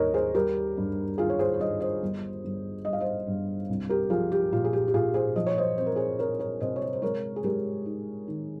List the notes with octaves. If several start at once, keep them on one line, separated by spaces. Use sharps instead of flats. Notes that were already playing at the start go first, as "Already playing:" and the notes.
Already playing: D#2 D#3 G3 A#4 C#5 D#5
G#4 C5
G3 G4 A#4
G2
D#3 F4 G#4
C#5
G#4 C5
C#5
G2 C5 D#5
C5 D#5
G1
G1
G3 D#5
F5
C5 D#5
G2
C2
G4 A#4
F3 F4 G#4
G4
A#2 F4
G#4
G4
G4
A#2 F4 G#4
G#4 C5
F3 D#5
C#5
C5 D#5
C4 C5
A#4
G#4 C5
C4 A#4 C#5
A#4 C#5
C3 C5 D#5
C#5
C5 D#5
C5
G#3 A#4 C#5
G#4
G#3 G4 A#4
D#4
D#3